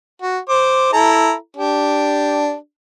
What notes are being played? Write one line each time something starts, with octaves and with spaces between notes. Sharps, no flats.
F#4
C5 D6
E4 A4 A#5
D4 G4